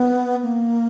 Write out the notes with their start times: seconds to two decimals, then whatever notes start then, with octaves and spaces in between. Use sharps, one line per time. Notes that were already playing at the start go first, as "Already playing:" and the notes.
Already playing: B3
0.43 A#3